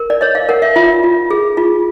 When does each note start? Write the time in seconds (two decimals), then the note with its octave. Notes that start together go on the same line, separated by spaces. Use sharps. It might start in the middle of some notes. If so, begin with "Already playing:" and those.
Already playing: A#4
0.10 D5
0.21 C#5 D#5
0.35 F5
0.49 A#4 F#5
0.62 E5
0.76 F4 E5
1.03 F4
1.31 G#4
1.57 F4